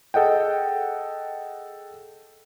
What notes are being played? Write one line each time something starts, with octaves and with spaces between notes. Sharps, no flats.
G#4 A4 D#5 F#5 G5